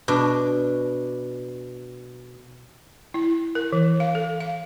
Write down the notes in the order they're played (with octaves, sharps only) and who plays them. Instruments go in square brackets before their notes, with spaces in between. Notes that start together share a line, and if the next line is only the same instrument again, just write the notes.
[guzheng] B2 D4
[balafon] E4
A#4
E3
F5
A4
F5